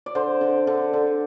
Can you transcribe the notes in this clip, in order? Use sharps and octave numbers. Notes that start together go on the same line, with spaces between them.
D5
D3 C5
D3
D3
D3